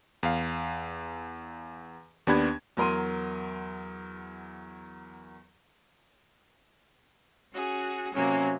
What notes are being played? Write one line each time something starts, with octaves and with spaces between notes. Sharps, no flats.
E2 F5
D#2 B3 D4 G4 B5 G#6
E2 F#3 A#4 C6 D#7
C#4 F#4 G#4
C3 F#3 A#3 C#4